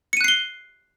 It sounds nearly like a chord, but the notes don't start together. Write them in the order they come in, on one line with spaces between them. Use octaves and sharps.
C#7 D#7 F#6 C7 G7